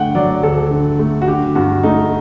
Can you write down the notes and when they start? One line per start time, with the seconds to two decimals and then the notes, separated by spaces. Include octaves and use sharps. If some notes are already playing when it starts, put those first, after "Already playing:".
Already playing: D3 A3 F#5 G5
0.15 F#3 D5
0.43 D2 A4
0.71 D3
0.99 A3
1.22 F#4
1.28 D3 G4
1.55 G2 F#4
1.83 A3 D#4